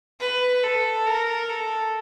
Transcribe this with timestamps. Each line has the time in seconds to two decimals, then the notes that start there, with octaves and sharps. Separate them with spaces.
0.20 B4
0.64 A4
1.07 A#4
1.49 A4